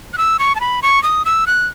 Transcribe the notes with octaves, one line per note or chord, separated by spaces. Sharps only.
F#6
E6
C#6
A5
B5
C#6
D#6
E6
F#6